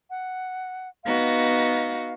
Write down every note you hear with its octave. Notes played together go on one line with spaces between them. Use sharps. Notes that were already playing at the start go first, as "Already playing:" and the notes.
F#5
B3 D#4 F#4 F5